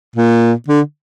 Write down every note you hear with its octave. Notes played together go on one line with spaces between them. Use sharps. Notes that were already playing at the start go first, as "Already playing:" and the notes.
A#2
D3